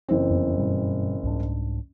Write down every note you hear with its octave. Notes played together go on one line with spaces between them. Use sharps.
F#1 E3 C4
F2 B3
G2 B2 G3
C2 G#2 D4